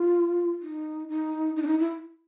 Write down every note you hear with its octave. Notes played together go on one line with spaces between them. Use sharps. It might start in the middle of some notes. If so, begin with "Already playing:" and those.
Already playing: F4
D#4
D#4
D#4
D4
D#4
E4